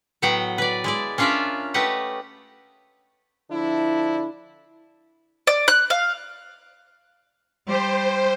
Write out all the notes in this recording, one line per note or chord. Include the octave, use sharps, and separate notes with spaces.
A2 F#3 B3 F#5 G5
B4 D5
G#3 E4 D5
C#4 D4 F4 A#4 D5 E5
A3 G4 B4 D#5 F#5
D3 F3 D4 E4
D5
F#6
F5
G3 G4 C5